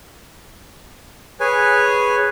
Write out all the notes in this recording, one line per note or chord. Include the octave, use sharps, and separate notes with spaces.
G#4 B4 C#5 G#5